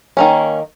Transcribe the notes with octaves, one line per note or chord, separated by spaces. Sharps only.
D#3 A#3 C#4